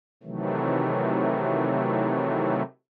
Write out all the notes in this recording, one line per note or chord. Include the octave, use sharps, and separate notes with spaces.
C3 D#3 E3 F#3 A3